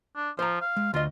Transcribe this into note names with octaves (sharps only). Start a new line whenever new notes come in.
D4
F3 C5 A#5
F5
G#3
D2 F4 D#5